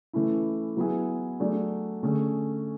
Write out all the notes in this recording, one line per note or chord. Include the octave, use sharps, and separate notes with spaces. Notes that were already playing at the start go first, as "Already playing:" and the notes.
E3 A3 C#4 E4
F#3 B3 E4 G#4
F#3 A3 D4 G#4
D3 A3 C#4 G#4